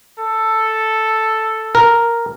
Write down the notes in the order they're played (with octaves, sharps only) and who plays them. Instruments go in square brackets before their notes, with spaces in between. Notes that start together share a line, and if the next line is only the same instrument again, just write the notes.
[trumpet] A4
[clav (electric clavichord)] A#4